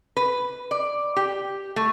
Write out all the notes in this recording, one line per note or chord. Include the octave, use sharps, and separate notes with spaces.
B4
D5
G4
A3